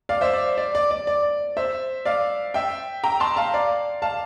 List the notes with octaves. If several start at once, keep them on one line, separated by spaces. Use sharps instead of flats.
D5 F5
C5 E5
D5
D5
D5
D5
D5
C5 E5
D5 F5
E5 G5
G5 A#5
A5 C6
F5 A5
D5 F5
F5 A5